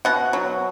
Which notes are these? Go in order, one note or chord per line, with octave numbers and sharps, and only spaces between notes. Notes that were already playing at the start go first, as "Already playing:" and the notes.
B2 F#5
F#3